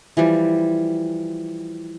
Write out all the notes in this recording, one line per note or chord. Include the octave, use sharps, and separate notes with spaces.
E3 F3 G3